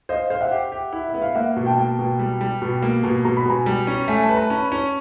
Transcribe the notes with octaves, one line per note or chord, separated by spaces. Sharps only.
C5 D#5 F5
C5 F5
E5 F#5
G4
G4
E4
E5
B3
F5
A#3 E5 F#5
B2
G5 A5
A#3
B2
G3
G3
B2
A#3
B2
B2 A#5
B5
B2 G#5 A#5
G3
C#4
A3 G#5
A5
B4
A#5
C#4 A5 B5
C#4